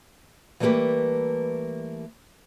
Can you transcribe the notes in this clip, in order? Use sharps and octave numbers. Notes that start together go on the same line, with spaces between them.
E3 G3 A3 A#3 G4 B4